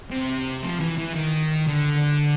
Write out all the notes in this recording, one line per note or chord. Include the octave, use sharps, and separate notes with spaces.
C3
F3
E3
E3
D#3
D3